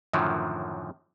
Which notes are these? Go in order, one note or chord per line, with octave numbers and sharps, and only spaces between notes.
F#2 A2 D3 D#3 F3 F#3